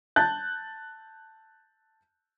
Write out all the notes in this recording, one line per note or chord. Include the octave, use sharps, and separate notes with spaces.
A5 F#6 G6 A6